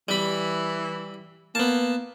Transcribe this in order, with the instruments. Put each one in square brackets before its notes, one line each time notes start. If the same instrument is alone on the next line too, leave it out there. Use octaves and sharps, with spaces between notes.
[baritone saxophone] E3 [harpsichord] G3 B5
[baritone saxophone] A#3 [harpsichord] B3 A5